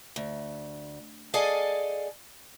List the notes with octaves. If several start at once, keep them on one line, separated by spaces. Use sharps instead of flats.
D2
G#4 A4 D5 D#5 F5 G#5